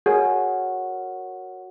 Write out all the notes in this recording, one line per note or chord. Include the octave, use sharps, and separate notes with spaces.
F#4 G#4 A#4 C#5 F#5